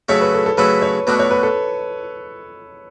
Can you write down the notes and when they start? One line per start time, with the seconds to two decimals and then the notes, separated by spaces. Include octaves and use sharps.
0.09 C#3 F#3 A3 E4 C#5
0.21 B4
0.34 A4
0.46 A4
0.58 C#3 F#3 A3 E4 B4
0.82 C#5
1.07 B2 A3 D4 F#4 B4
1.19 C#5
1.31 B4
1.43 A4